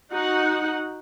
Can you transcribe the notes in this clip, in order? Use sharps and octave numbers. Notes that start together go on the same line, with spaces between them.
D#4 F#4 F#5